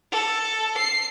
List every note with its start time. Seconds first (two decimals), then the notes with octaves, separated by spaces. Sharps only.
0.11 A4
0.76 C7